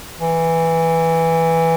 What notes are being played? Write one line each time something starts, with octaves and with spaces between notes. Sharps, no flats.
E3